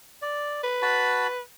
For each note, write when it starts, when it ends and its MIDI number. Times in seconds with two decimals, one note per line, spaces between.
0.22 0.61 74
0.63 1.40 71
0.82 1.27 66
0.82 1.27 81
0.82 1.27 83